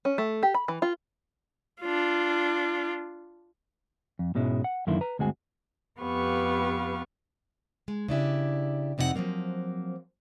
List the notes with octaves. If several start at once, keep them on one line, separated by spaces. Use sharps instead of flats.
C#4
A3
G4
B5
E3
F4
D4 F4
F2
G#2 B2 G#3 C#4 E4
F#5
F#2 D3 D#3 A#3 E4 C6
B4 A#5
D2 G2 G#3 C4 F#4 G#5
F2 B3 G4 B4 F5 C#6
G#3
C#3 D4 E4 G4
F2 C3 D#4 E4 F#5
F3 F#3 A3 A#3 C4